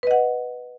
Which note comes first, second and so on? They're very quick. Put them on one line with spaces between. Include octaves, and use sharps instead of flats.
B4 D#5 F#5